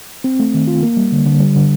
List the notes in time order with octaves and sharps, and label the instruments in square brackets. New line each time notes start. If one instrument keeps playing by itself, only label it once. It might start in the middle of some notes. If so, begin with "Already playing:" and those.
[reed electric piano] C4
A3
D#3
F4
A#3
G3
D3
D3
G3
D3